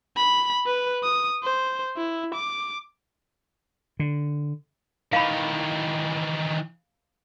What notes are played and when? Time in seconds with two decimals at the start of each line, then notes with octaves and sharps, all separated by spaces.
0.17 B5
0.67 B4
1.03 D#6
1.43 C5
1.97 E4
2.35 D6
4.00 D3
5.13 D#3 E3 F5 B5